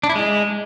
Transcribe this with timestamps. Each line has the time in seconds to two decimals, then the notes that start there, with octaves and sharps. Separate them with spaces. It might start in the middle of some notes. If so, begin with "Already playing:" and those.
0.03 D4
0.09 E4
0.15 G#3